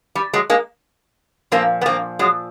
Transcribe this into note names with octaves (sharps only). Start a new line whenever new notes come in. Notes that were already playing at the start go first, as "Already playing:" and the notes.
G3
F#3 G#3
G#3 A#3
A#2 F3 A#3 C4
B3
A#3 C4
F#3 G#3